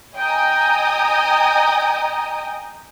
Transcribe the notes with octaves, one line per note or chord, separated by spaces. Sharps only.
D#5 G5 G#5 A#5 D#6